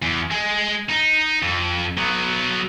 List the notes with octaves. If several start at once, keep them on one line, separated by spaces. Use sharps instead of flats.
E2
G#3
D#4
F2
F#3 B3